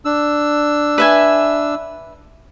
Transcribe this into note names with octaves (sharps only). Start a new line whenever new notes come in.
D4 E6
B4 E5 G#5